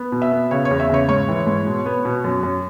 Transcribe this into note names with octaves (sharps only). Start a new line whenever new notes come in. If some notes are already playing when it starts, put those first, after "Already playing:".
Already playing: B3
B2
E5
B3
C#3 C#5
C#5
E2
E5
C#3 C#5
G#2 C#5
E3
G#2
B2
B3
B2
F#2
F#2